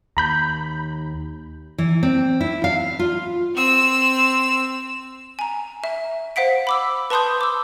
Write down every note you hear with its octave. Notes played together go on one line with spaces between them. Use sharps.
D#2 A#5 B5 G6
E3
C4
E4
F5
F4
C4 E6
G#5 A#5
E5
C5 F5 F#5 B6 D7
B5 D6 E6
B4 A5 B5 C6 D#6 G6
D6 E6